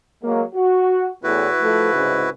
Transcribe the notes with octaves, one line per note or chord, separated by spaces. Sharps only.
F#3 G#3 A#3
F#4
E2 A2 E4 F#4 B4
F3 A3
C2 G#2 C#3